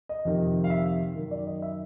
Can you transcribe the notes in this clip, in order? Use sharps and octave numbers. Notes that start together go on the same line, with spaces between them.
D#5
F2 C3 D#3
F5
E5
F#2 D#3
D5
D#5
E5